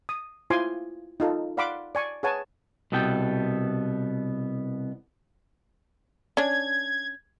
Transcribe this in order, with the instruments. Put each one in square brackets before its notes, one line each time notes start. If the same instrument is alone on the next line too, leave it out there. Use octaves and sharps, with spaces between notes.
[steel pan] D#6
E4 F4 C5 G#5 C6 D6
D#4 F4 A4
D5 F5 F#5 B5 C6 D6
D5 G#5 C#6
G#4 B4 C#5 F#5 G#5 A5
[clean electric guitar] C2 B2 B3 A4 G5
[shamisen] C#4 D4 [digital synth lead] G#6